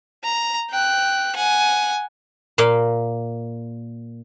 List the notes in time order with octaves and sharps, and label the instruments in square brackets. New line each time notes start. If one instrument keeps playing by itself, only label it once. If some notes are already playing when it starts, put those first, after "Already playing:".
[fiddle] A#5
G5 F#6
F#5 G#5
[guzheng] A#2 A#3 F5